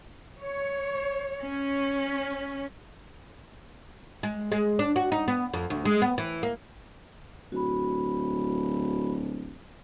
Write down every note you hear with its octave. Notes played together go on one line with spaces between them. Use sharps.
C#5
C#4
G#3
G#3
D4
F#4
D#4
B3
F2
D2
G#3
B3
E3
A#3
D1 F#4 B5